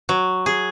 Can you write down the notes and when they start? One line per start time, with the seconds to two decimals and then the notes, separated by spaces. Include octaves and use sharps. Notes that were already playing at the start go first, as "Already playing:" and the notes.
0.09 F#3
0.46 G#4